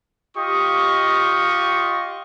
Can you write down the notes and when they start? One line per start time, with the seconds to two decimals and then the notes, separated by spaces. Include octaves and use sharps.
0.37 F4 G4 D#5 F5 C#6 D#6